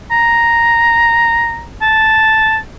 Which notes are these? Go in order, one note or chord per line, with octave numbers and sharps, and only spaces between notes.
A#5
A5